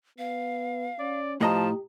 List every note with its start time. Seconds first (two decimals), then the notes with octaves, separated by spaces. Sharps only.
0.19 B3 F5
0.99 C#4 D5
1.41 A2 F3 G4 D#5 A5 A#5